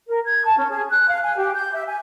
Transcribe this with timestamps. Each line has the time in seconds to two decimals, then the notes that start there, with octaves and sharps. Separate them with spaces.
0.07 A#4
0.25 G#6
0.44 A5
0.56 C#4
0.70 G#4
0.88 F#6
1.08 F5
1.22 G#5
1.37 G4
1.54 G6
1.74 E5
1.87 G#5